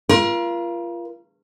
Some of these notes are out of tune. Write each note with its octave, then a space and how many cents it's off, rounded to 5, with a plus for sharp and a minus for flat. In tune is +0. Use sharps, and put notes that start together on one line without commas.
F4 -25 A#4 +35